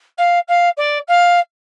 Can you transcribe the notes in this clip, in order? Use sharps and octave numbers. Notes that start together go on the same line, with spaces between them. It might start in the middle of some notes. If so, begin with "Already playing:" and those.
F5
F5
D5
F5